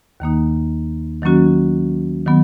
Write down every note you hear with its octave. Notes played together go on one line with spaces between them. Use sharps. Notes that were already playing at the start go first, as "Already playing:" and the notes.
D#2 D#3 A#3 D#4
D#3 F#3 A#3 C#4 F#4
D#3 F#3 B3